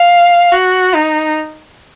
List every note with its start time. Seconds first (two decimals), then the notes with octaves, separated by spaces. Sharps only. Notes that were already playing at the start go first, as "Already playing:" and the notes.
Already playing: F5
0.52 F#4
0.95 D#4